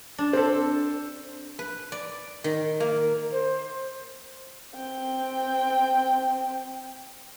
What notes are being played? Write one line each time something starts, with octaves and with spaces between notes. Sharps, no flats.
D4
C4 A4
B4
D5
D#3
A#3
C5
C4 G5